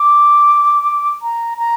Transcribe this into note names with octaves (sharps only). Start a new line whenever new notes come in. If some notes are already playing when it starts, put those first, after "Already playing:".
Already playing: D6
A#5
A#5